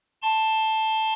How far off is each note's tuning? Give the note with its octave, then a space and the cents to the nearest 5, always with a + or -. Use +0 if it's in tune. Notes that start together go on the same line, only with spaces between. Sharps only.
A5 +0 C6 +20